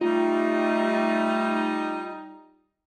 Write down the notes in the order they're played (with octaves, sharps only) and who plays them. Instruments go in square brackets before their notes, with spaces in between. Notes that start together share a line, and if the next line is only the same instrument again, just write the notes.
[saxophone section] G3 D#4 [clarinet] A3 [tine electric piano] F4